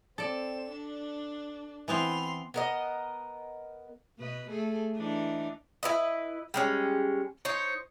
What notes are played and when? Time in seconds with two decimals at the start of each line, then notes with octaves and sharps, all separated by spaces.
0.18 C4 A4 D5 E7
0.70 D4
1.88 E3 B3 C4 C6 F7
2.54 B3 A#4 D#5
4.18 B2 B4 D#5
4.49 A3 G#4 A4
4.96 E3 D4 D#4
5.83 E4 B4 D#5
6.54 G3 G#3 C#4
7.45 D#4 C5 C#5